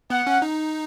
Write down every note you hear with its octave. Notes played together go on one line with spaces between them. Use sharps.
B3 F#5
C#4
D#4